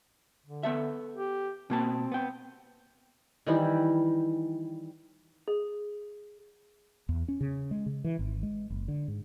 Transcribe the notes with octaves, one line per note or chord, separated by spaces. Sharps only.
D3
B3 A4 E5
G4
B2 A#3 C4 A5
B3 G5
D#3 E3 G3 E4
G#4
E2
C#4
C#3
G#3
C#3
E3
G#1
G#3
F#1
D3
G#2